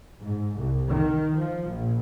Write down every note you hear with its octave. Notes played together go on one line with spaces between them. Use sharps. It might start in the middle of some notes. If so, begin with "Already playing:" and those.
G#2
C2
D#3
F3
A#1